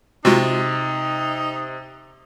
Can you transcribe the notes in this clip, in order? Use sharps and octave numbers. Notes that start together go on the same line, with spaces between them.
C3 G#3 D#4 F4 F#4